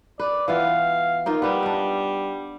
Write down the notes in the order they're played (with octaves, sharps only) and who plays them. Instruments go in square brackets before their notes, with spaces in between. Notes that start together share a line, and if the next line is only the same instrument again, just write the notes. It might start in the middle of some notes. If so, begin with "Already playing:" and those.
[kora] B4 [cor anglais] D5
[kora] E3 B3 F4 [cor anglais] F5
[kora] A#3 D#4 F4
[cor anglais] G3 [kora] B3 B4
[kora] D4 D#5